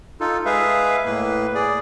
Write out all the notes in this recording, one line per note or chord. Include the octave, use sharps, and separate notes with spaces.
D#4 F4 A4
G#3 G#4 B4 E5 F5
A2 A#3 B4
G#4 D5